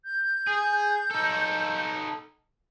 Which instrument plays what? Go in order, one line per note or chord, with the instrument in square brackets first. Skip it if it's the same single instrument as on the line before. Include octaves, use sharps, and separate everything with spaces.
[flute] G6
[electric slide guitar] G#4
D#4 A4